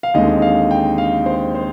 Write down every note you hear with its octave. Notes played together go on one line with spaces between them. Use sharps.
F5
D#2 D3 G#3 C4 D#5
F5
G5
F5
C5
C5